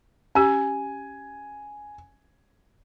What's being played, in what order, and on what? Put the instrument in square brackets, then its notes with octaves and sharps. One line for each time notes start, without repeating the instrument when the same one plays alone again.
[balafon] C#4 G4 [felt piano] G#5